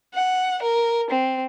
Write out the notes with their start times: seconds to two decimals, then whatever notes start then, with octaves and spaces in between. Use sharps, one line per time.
0.14 F#5
0.62 A#4
1.10 C4